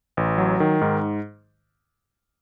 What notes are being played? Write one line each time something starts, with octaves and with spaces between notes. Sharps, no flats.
A1
F#3
D#3
G#2